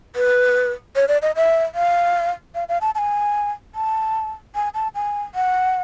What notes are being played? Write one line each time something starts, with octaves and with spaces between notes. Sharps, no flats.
B4
C#5
D5
D#5
E5
F5
F5
F5
A5
A5
G#5
A5
G#5
A5
G#5
F#5